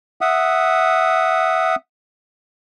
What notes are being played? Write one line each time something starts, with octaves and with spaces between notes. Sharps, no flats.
E5 F#5 D#6